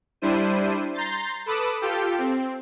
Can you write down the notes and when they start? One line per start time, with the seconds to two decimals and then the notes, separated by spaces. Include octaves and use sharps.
0.22 G3 D4 E4 C5 D#7
0.94 A#5 C6 G6 A6 C7
1.46 A4 B4 B5 D6 D#6 E7
1.82 F4 G4 A4 G5
2.18 C4